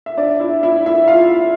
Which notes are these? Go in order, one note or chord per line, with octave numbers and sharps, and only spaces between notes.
E5
D4 D5
E4 E5
E4 E5
E4 E5
F4 F5